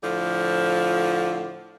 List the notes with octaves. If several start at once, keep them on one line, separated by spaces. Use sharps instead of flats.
A2 D3 F3